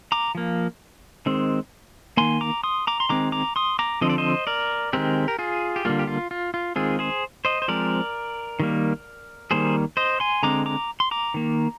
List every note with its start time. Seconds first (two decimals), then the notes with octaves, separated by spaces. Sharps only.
0.12 A#5 D6
0.35 F3 A#3
1.26 D#3 G#3 C4
2.17 D#3 A#3 G#5 C6
2.41 A#5 D6
2.63 C6 D#6
2.87 A#5 D6
3.00 C6
3.09 D#3 G#3 C4 A#5 D6
3.32 A#5 D6
3.56 C6 D#6
3.79 A#5 D6
4.01 D3 F3 C4 D#5
4.10 D5
4.18 C5 D#5
4.47 A#4 D5
4.93 D#3 G#3 C4 G4 A#4
5.28 A#4
5.39 F4 G#4
5.76 G4
5.85 D3 G3 A#3 F4
5.99 G4
6.07 F4
6.31 F4
6.54 F4
6.76 D#3 G#3 C4 F4 G#4
6.99 G#4 C5
7.45 C5 D#5
7.62 C5
7.68 F3 G#3 C4 A#4 D5
8.60 D#3 G3 A#3
9.51 D#3 G3 A#3 G#4 C5
9.97 C5 D#5
10.20 G#5 C6
10.43 D3 G#3 C4 A#5 D6
10.66 A#5 D6
11.00 C6
11.11 A#5 D6
11.34 D#3 A#3